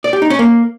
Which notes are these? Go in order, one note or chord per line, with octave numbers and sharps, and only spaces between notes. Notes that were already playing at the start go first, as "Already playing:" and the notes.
D5
G4
D#4
C#4
A#3